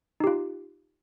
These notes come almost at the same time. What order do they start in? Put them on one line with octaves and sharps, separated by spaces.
D#4 G4 F4